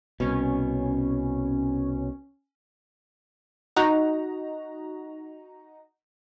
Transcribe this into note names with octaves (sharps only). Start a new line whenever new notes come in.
C2 B2 C#4
D#4 F#4 A#5